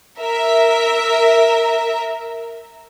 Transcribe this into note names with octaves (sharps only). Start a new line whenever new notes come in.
A#4 E5